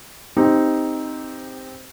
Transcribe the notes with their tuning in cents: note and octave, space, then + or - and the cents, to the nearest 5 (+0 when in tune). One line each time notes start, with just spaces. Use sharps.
C4 +0 D#4 +0 G4 +20